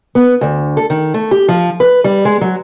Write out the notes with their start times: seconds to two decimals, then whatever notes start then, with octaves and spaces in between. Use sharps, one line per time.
0.15 B3
0.41 D2
0.77 A4
0.90 D#3
1.14 A3
1.31 G4
1.48 F3
1.80 B4
2.04 G3
2.25 G#3
2.41 F#3